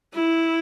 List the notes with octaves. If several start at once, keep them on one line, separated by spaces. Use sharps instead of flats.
E4